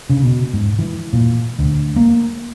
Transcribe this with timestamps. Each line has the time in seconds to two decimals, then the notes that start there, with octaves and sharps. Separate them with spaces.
0.10 C#3
0.23 B2
0.53 G#2
0.79 E3
1.13 A#2
1.59 D2
1.96 A#3